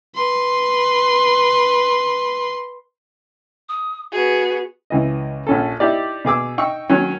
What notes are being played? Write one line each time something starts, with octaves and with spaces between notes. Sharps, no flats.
B4 C6
D#6
B3 F#4 G#4
C#2 E3 D#5
A#1 C#4 A4
D#4 E4 G4 D5
B2 G#4 D6 E6
D#4 G5 C#6 E6
D#3 F#3 C#4